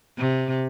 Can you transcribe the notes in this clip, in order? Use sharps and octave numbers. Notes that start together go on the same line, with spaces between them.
C3